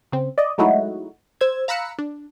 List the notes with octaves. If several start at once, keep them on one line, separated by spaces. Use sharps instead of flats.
C#3 C4
D5 D#5
F#3 G#3 A3 D#4 E4 F#4
C5 E6 G#6
F5 A#5 B5 E6 F#6 C#7
D4